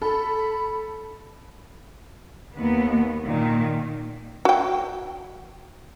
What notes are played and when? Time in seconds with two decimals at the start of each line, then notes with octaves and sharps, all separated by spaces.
0.02 A4 B5
2.56 D#2 B3
3.27 A#2 D#3
4.45 F#4 G5